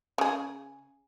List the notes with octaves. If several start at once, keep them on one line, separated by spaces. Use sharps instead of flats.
C#3 G#4